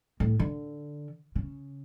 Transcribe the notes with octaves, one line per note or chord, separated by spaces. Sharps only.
A2
D3
C#3